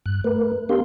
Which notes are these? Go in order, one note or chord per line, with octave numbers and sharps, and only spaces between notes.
G2 F#6
A3 A#4 B4
B3 D4 G4 A#4 F5 C6